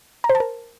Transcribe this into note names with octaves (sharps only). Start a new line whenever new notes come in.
A#5
C5
A5
A#4